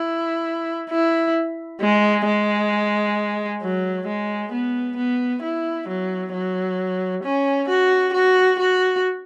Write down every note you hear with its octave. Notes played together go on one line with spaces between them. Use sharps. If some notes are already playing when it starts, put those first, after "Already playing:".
Already playing: E4
E4
G#3
G#3
F#3
G#3
B3
B3
E4
F#3
F#3
C#4
F#4
F#4
F#4